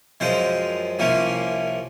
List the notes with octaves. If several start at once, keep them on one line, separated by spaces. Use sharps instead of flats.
F#2 F3 G#3 C4 C5
C2 C3 F3 A#3 C#4